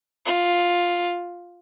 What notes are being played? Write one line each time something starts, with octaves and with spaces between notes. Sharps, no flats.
F4